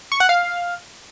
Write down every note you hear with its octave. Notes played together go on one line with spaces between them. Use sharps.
C#6
F#5
F5